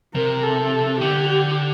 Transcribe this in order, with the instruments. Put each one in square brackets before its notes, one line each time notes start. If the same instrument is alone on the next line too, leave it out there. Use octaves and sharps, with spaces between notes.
[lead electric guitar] C3 [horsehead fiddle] A#4
[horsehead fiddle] A4
[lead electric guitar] D3 [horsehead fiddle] G4
[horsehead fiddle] G4